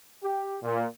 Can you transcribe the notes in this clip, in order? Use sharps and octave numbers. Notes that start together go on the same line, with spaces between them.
G4
A#2